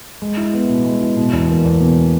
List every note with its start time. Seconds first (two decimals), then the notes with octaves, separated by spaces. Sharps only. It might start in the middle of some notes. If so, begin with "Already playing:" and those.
0.22 G#3
0.37 E4
0.54 B3
0.69 B2
0.85 G#3
1.01 E4
1.17 B2
1.33 E2
1.49 A#3
1.65 E2
1.81 B2